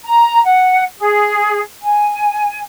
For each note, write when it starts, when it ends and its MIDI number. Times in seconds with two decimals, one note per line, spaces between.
0.05 0.42 82
0.45 0.84 78
0.98 1.60 68
1.83 2.60 80